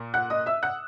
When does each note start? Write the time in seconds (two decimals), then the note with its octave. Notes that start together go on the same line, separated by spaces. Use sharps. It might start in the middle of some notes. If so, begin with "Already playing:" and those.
Already playing: A#2 A#3
0.14 F#5 F#6
0.30 D#5 D#6
0.46 E5 E6
0.63 F#5 F#6